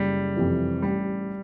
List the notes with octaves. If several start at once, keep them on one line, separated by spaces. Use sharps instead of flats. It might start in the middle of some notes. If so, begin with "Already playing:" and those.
Already playing: F#1 G3
F2 C3 E3
A1 G3